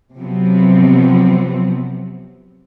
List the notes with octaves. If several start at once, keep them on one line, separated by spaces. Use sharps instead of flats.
C3 F3 F#3 B3 C4